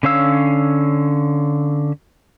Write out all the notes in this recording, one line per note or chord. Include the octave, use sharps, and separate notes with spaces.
D3 C#4 C#5 F5 E6